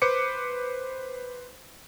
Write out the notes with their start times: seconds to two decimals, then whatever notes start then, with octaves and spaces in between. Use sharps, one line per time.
0.02 B4 C5 D6 C#7